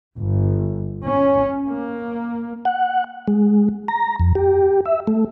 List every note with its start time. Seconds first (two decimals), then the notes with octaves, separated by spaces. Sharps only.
0.18 G1
1.05 C#4
1.66 A#3
2.65 F#5
3.28 G#3
3.88 A#5
4.20 F2
4.35 G4
4.85 E5
5.07 A3